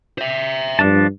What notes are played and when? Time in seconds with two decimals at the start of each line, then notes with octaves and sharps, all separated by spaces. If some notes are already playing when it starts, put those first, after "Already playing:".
0.18 C5 E5
0.79 G2 F3 D4 A5